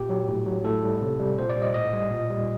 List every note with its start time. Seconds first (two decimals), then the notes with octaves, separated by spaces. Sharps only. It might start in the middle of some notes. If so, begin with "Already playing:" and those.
Already playing: A#2 G4
0.09 F#3
0.28 A2
0.46 F#3
0.64 A2 A4
0.83 G3
1.01 C3
1.19 G3
1.38 A#2 C5
1.50 D5
1.56 G3
1.62 D#5
1.74 A2 D#5
1.93 G3
2.11 A#2
2.30 G3